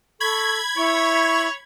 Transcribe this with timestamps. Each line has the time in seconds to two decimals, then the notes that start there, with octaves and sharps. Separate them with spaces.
0.20 A4 B5 C#6 G#6
0.76 E4 C#5 C#6